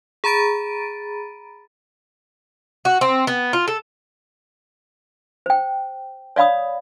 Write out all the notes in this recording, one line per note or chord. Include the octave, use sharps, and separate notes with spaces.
G#4 A#5 B5 A6 D7 D#7
F#4
C4
B3
F4
A4
C5 G5
C#5 D5 F5 B5 D#6